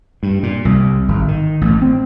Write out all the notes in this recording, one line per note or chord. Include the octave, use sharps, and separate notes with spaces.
G2
A#2
C2
G#1
D#3
A1
C4